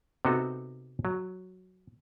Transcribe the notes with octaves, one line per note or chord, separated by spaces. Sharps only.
C3 B3 C4 D#4 F#4 A4
F#3